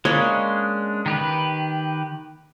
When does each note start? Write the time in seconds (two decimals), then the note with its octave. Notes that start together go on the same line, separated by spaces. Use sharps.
0.05 G#3 A#3 C#4 D4 C#5 B5
1.06 D#3 G4 B4